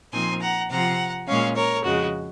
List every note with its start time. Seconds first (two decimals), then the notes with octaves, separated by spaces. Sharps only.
0.13 A#2 F3 C4 D#4 G#5 C6
0.41 F#5 A#5
0.70 C3 F3 C4 F4 F#5 A#5
1.27 A#2 G#3 C#4 C#5 F5
1.56 A#4 C#5
1.84 F2 C#3 G#3 F#4